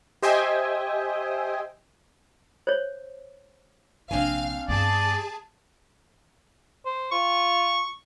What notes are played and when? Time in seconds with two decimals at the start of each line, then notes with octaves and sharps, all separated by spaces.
0.22 G4 C5 D#5 E5 G5 G#5
2.67 C5 C#5
4.11 A#1 C3 C4 D4 F5 G#5 F6
4.68 G2 B3 G#4 D5 A5
6.85 C5
7.12 F4 C#6